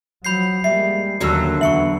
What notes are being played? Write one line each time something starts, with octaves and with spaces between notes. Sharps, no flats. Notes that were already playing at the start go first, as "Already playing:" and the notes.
F3 F#3 B5 G6 C7
G3 G#3 A#3 E5 C7
D#2 D3 F#3 A3 A#3 C#4 F#4 E6
E2 B3 E5 C#6 C#7 F#7